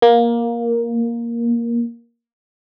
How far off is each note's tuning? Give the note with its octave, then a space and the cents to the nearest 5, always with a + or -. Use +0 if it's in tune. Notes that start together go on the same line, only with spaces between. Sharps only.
A#3 +10